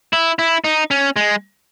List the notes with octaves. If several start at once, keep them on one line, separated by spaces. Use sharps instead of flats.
E4
E4
D#4
C#4
G#3